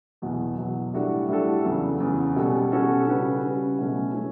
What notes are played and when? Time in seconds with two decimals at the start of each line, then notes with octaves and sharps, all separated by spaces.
0.22 E2 B2 F#3
0.58 E2 B2 F#3
0.94 A2 G3 D4 F#4 A4
1.29 A2 G3 D4 F#4 A4
1.64 E2 C#3 F#3
2.00 E2 C#3 F#3
2.36 B2 G3 C#4 F#4 A4
2.72 B2 G3 C#4 F#4 A4
3.07 C#3 G3 C#4 F#4 B4
3.43 C#3 G3 C#4 F#4 B4
3.78 B2 F#3 A3 C#4
4.14 A3 C#4